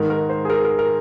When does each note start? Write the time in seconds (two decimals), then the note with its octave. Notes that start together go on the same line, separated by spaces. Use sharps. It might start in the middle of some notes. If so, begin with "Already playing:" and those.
Already playing: G#2 D#3 A#4
0.10 A#4
0.29 C5
0.45 G#4
0.50 A#4
0.65 A#4
0.79 A#4